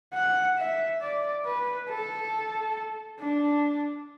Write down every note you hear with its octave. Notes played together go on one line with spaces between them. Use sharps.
F#5
E5
D5
B4
A4
D4